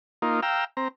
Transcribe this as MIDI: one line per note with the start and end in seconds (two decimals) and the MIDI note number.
0.22 0.40 58
0.22 0.40 63
0.22 0.40 65
0.43 0.64 77
0.43 0.64 79
0.43 0.64 82
0.43 0.64 88
0.77 0.88 60
0.77 0.88 82